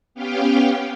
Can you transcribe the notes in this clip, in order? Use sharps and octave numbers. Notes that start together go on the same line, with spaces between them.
B3 C#4 G4 F5 G5